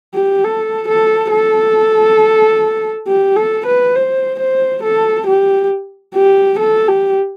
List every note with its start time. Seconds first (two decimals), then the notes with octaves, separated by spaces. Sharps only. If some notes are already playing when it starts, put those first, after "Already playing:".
0.14 G4
0.44 A4
0.88 A4
1.31 A4
3.07 G4
3.36 A4
3.66 B4
3.96 C5
4.39 C5
4.83 A4
5.27 G4
6.15 G4
6.59 A4
6.88 G4